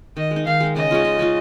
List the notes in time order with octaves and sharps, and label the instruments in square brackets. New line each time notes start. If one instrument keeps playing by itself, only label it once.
[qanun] D#3 [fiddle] D#5
[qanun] G#3
D#4
[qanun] D#3 [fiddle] F5
[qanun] G#3 D#4
[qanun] C#3 [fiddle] D#5
[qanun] G#3 C#4 F4
C#3
G#3 C#4 F4